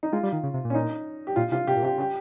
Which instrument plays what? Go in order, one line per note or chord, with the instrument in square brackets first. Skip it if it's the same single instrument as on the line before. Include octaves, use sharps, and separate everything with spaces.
[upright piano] D#4
[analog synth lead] G#3 [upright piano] F4
[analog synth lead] G3
D#3
C#3
C3
A#2
[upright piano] C#4
D#4
G4
[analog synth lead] A#2 [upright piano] F4
[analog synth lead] C3 [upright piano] F4
[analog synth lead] C3 [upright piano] G4
[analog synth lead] A#2
[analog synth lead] C3 [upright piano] G4
[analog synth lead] C#3
[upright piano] G4